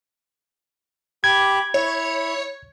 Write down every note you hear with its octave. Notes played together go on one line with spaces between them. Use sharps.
G4 B5 D6 G#6
E4 C#5